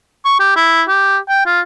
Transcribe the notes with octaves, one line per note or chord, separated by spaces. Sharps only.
C#6
G4
E4
G4
G5
F4